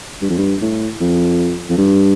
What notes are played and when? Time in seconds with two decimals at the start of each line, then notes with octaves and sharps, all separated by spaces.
0.22 G2
0.30 F2
0.38 G2
0.61 A2
1.00 F2
1.70 F2
1.78 G2